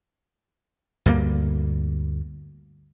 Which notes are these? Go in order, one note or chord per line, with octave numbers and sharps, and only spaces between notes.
D2 G2 G3 A#3